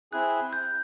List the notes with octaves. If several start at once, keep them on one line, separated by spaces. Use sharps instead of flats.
C4 E4 G#4 F#6
G6